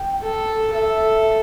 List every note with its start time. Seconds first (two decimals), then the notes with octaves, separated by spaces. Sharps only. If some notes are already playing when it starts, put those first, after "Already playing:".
Already playing: G5
0.22 A4
0.73 A4 E5